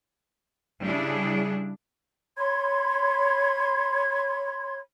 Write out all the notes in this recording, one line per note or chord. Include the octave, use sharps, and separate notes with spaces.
C#3 G3 D4 E4 G#4
C#5 B5 C6 G#6